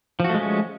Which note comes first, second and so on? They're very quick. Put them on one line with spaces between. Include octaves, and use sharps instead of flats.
F3 F#4 A3 G#3 C#4